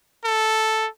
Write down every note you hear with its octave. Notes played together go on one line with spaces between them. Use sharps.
A4